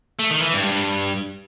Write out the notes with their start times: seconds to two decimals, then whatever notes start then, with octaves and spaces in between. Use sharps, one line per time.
0.19 A3
0.31 D#3
0.42 E3
0.53 G2
0.64 G2